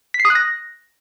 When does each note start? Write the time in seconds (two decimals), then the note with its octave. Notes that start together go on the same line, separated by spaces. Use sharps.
0.14 B6
0.20 C7
0.25 D#6
0.30 F#6
0.35 A#6